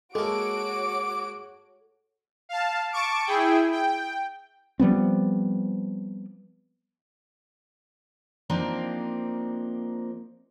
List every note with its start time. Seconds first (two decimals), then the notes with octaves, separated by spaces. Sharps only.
0.15 G#3 A#3 F#4 A4 C#5 D6 D7
2.49 F5 A5
2.92 A5 C#6 D6 D7
3.26 E4 G#4 G5
3.72 G5
4.80 F3 G3 B3 C4
8.50 F3 A#3 C4 D4 D#4